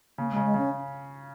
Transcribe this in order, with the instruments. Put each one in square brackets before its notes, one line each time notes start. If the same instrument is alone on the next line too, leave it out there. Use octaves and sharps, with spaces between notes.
[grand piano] C#3 [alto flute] A#3
[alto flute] G#3
[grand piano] C#3
[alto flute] G#3
[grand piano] C#3 [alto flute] C#4